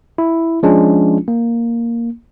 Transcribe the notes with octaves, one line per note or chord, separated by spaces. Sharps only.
E4
F3 G#3 C#4 D4 F4
A#3